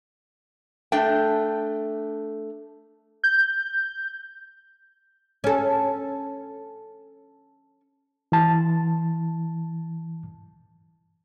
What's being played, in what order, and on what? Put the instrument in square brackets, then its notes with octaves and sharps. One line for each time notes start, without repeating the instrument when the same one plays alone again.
[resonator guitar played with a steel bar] A3 D4 G5
[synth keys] G6
[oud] C#4 A4
[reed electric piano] E3 A5